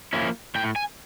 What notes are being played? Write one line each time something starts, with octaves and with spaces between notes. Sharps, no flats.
F3 A#3 C#4 E4
A2 G5
G#5